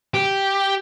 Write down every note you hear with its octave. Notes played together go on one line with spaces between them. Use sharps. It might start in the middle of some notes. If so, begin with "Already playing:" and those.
G4